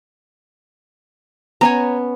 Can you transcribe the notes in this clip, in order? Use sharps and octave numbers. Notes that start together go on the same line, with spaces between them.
B3 C#4 C#5 G#5 A#5